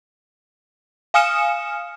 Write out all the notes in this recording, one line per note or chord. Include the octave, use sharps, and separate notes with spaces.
F5 G#5 D#6 F6 C#7 E7